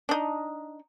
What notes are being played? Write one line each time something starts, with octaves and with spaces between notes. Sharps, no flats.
D4 D#4